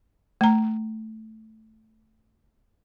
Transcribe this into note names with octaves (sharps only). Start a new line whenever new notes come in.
A3 A#5